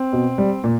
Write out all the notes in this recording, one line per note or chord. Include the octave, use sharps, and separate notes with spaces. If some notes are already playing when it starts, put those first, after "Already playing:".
Already playing: C4
B2
G3
A#2